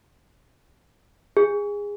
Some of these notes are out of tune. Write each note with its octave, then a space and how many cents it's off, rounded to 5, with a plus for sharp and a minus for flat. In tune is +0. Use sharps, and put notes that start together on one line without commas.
G#4 -20